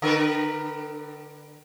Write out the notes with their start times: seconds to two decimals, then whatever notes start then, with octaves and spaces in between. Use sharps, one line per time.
0.02 D3 A#4 B4